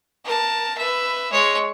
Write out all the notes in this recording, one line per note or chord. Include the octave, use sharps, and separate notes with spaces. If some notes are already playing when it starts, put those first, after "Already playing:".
A#4 A5
B4 E5
G#3 C#5